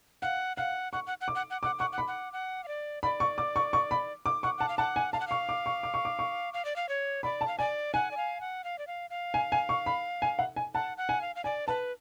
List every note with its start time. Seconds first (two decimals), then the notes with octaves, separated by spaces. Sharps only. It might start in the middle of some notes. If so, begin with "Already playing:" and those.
0.22 F5 F#5
0.57 F5 F#5
0.93 F#5 C#6
1.07 F#5
1.21 F#5
1.28 D6
1.35 F#5
1.50 F#5
1.63 F#5 D6
1.79 F#5 C#6
1.93 F#5
1.98 B5
2.08 F#5
2.33 F#5
2.64 F5
2.68 D5
3.03 D5 B5
3.20 C#6
3.38 D6
3.56 C#6
3.73 C#6
3.91 B5
4.26 D6
4.43 F#5 C#6
4.58 F#5 A5
4.69 F5
4.78 F#5 A5
4.96 G#5
5.13 F5 A5
5.20 F#5
5.27 F5 C#6
5.49 D6
5.66 C#6
5.83 D6
5.94 C#6
6.05 D6
6.19 C#6
6.54 F5
6.65 D5
6.76 F5
6.89 C#5
7.23 D5 B5
7.41 A5
7.48 F5
7.59 D5 G#5
7.94 F#5 G#5
8.11 D5
8.17 F5
8.41 F#5
8.64 F5
8.79 D5
8.87 F5
9.10 F5
9.34 G#5
9.52 G#5
9.69 C#6
9.86 B5
10.22 G#5
10.39 F#5
10.56 G#5
10.74 F#5 A5
10.97 F#5
11.09 G#5
11.21 F5
11.36 F5
11.44 D5 G#5
11.68 B4 A5